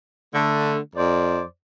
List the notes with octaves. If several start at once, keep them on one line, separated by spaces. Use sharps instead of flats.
D3 A3
F2 C5 D5